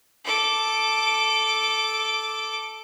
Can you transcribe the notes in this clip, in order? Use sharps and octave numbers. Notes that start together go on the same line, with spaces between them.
A4 D6